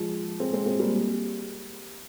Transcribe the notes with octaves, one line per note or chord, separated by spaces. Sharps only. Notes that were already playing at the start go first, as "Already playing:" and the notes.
Already playing: F3 G#3
G#3 C4
G#3 C4
G#3 C4
G3 A#3